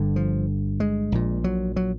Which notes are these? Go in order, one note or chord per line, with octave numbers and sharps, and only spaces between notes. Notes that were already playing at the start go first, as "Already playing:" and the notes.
Already playing: G1 G2 D3
F3
G#3
A#1 A#2
F#3
F#3